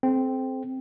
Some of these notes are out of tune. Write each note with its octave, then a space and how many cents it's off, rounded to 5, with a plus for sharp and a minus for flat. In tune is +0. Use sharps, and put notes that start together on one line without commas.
C4 +0 A4 -40